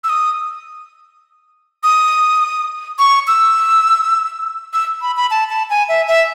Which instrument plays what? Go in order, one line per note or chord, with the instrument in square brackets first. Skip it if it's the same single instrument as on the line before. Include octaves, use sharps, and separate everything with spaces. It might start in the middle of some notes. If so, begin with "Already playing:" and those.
[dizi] E6
D#6
D#6
C#6
E6
E6
B5
B5
A5
A5
G#5
E5
E5